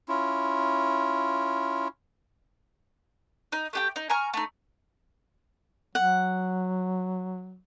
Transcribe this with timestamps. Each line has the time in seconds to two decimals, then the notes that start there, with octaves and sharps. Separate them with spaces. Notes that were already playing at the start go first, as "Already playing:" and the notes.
0.08 C#4 E4 F4
3.52 D#4
3.73 A3 G4 G5
3.96 D#4
4.10 G#5 A#5 C#6 F6
4.34 A3 D#4
5.95 F#3 F#5